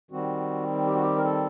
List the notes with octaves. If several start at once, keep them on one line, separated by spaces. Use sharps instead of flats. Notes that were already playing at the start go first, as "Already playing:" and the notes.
D#3 G3 C4 F#4
G4
F#4
G4
A#4
A4